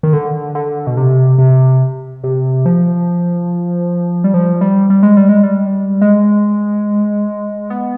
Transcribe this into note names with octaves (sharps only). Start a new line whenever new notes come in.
D#3
D3
D3
B2
C3
C3
C3
F3
G3
F3
G3
G3
G#3
G3
G#3
G3
G#3
B3